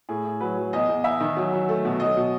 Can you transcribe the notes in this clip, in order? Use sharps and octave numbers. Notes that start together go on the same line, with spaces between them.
A2 G#4
A2
F#3 B4
F#3
E2 D#5
E2
E2 E5
D#3
F#3
F#3
A3
B2
F#3 D#5
B2